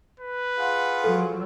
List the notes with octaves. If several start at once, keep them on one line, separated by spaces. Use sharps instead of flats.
B4
F4 G#4 F#5
F3 F#3 A4